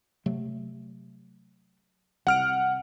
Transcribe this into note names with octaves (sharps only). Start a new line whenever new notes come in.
C3 F#3 A3
C2 F#5 F6 D7